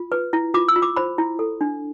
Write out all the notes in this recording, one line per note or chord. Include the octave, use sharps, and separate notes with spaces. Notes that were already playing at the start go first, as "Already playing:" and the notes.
Already playing: F4
B4
E4
F4 D6
E6
F4
D6
C5 B5
E4
A4
D4